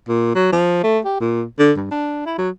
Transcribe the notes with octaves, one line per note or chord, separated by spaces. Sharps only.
A#2
F#3
F3
A3
G4
A#2
D3
G2
D4
E4
F#3